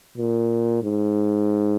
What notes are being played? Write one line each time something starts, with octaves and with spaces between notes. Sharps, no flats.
A#2
G#2